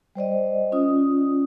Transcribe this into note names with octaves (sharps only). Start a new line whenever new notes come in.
G3 C5 D5 D#5
C#4 F4 D#6